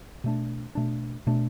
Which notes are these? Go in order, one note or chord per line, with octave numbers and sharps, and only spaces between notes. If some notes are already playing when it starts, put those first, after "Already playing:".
B2 A3 D4
B2 A3 D4
B2 A3 D4